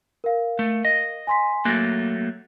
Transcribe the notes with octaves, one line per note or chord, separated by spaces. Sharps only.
A#4 F5
A3
D#5
G#5 C6 B6
F#3 A3 A#3 F#6 A6